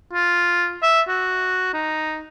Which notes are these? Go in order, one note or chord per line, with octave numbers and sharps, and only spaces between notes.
F4
E5
F#4
D#4